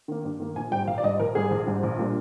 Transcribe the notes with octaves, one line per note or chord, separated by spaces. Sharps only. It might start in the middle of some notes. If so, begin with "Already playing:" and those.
D#3 A#3
G2
D#3 A#3
A#1 G#5
G#2 G3 G5
A#1 F5
D5
G#2 G3 D#5
A#1 A#4
G#2 G3 G#4
A#1
G#2 G3
A#1
A#2 G3 D4